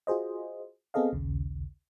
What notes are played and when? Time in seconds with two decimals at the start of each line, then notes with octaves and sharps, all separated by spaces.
0.07 F4 F#4 G#4 C5 D#5
0.94 B3 C4 G#4 A4 D#5 F5
1.13 A#1 D#2 C#3